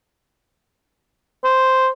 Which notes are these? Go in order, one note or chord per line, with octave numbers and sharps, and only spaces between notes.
C5